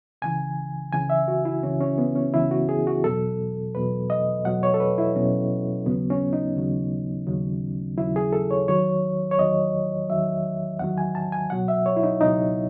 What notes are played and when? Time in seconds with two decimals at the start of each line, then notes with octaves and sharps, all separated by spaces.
0.22 C#2 C#3 E3 G#5
0.92 C#2 C#3 E3 G#5
1.10 E5
1.28 F#4
1.45 E4
1.63 C#2 C#3 E3 C#4
1.81 C#4
1.98 B3
2.16 C#4
2.34 C#2 C#3 E3 E4
2.51 F#4
2.69 G#4
2.87 F#4
3.04 E2 B2 F#3 A4
3.75 E2 B2 F#3 B4
4.10 D#5
4.45 E2 B2 F#3 F#5
4.63 C#5
4.74 A4
4.80 B4
4.98 E4
5.15 E2 B2 F#3 C#4
5.86 D#2 C#3 F#3 B3
6.10 C#4
6.33 D#4
6.57 D#2 C#3 F#3
7.27 D#2 C#3 F#3
7.98 D#2 C#3 F#3 E4
8.16 G#4
8.33 A4
8.51 C#5
8.68 E2 D#3 F#3 C#5
9.31 C#5
9.38 E2 D#3 F#3 D#5
10.09 E2 D#3 F#3 E5
10.79 E2 D#3 F#3 F#5
10.98 G#5
11.15 A5
11.32 G#5
11.50 C#2 B2 F#3 F#5
11.68 E5
11.86 C#5
11.96 E4
12.03 D#4
12.21 C#2 B2 F#3 D#4